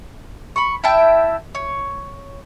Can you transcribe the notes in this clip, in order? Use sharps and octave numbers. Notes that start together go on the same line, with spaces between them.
B5 C#6
E4 E5 G5 A5
C#5